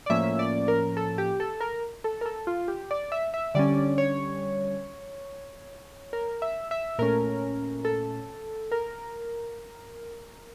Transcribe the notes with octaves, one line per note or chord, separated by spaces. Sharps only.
D5
A2 F3 A#3 C#4 E5
D5
A#4
A4
G4
A4
A#4
A4
A#4
A4
F4
G4
D5
E5
E5
D3 G3 C#4 D5
C#5
A#4
E5
E5
A#2 A3 C#4 A#4
A4
A#4